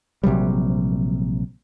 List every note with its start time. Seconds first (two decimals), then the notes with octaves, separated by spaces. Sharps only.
0.24 A#1 C3 F#3 G3